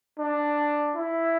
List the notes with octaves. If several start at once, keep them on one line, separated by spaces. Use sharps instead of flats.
D4
E4